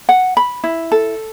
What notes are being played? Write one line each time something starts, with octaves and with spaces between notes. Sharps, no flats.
F#5
B5
E4
A4